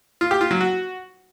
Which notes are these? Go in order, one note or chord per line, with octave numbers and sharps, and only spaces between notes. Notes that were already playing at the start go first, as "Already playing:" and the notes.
F4
G4
F4
F#3
F#4